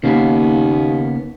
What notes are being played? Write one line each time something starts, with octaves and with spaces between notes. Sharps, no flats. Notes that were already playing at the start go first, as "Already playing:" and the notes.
D#2 C#3 A#3 B3